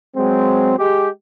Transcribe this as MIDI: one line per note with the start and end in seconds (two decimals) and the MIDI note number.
0.16 0.76 54
0.16 0.76 56
0.16 0.76 60
0.79 1.09 56
0.79 1.09 67